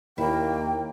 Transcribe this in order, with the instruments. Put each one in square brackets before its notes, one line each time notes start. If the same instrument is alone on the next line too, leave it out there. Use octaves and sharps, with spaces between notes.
[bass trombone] D#2 [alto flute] A#3 [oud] E4 [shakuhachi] G5